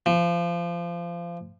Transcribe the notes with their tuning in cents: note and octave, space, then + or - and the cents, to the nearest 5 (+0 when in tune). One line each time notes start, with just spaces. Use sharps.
F3 -25